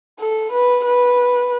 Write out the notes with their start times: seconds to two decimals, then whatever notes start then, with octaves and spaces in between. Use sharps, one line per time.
0.20 A4
0.52 B4
0.85 B4